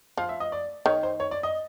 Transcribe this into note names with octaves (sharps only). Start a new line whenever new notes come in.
F3 F5
E5
D#5
D5
D#3 C#5
C5
C#5
D5
D#5